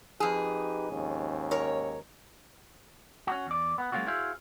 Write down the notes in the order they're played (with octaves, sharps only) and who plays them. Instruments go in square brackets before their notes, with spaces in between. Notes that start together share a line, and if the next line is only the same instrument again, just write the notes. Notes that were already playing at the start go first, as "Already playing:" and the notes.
[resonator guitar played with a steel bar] F2 G#4 [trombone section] D#4 G4 B4
[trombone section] D#2 G#2 C#4
[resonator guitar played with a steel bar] A#4 C#5
[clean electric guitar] C#4 F#4
E2 D5
B3
F#3 G#3 A#3 C#4 F4 F#4
E4 F#4 G#4 C5 E5 F5